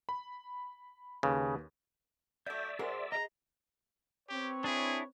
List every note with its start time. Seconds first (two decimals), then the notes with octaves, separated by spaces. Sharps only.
0.09 B5
1.23 D#2 C#3 B4
2.46 F#3 A3 D5 E5 G6
2.79 G#3 F#4 G#4 A#4 C5 C6
3.12 G#4 D#5 A#5
4.29 C4 G4 B4 C#5
4.64 D4 E4 G#4